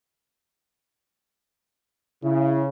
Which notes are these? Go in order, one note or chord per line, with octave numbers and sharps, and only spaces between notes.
C#3 E4